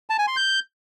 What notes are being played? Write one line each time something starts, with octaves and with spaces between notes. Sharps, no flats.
A5
G#5
C6
G6